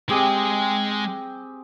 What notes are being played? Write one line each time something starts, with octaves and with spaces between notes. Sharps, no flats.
G#3 C4 G4 G#4 D#5